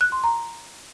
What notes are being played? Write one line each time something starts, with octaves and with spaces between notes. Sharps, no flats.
F#6
C6
A#5